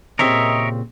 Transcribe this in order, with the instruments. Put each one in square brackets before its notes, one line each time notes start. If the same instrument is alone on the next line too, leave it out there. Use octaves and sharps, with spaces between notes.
[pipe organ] A#2 [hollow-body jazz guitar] C#3 C4 G4 [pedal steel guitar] A#4 C#5 E5 [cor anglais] D#5